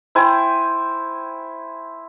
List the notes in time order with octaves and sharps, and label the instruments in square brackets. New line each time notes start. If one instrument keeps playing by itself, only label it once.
[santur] E4 C5 G5 G#5